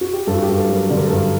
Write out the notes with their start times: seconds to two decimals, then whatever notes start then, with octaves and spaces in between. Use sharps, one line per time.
0.01 F#4
0.13 G4
0.27 G2 A4
0.35 F#4
0.42 G4
0.48 G2
0.59 A4
0.69 F#3
0.75 A#4
0.90 D3
0.97 A#4
1.04 A4
1.10 G2 A#4